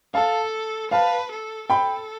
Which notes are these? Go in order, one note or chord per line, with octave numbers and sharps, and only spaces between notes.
A4 F5 A5
B4 F5 A5
A4
A4 G5 B5